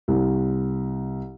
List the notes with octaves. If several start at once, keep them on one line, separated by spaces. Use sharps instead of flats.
C2